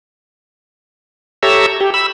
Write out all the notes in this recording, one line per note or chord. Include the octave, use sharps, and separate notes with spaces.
G4 A4 C#5 E5 A#5 E6
G4
B5 E6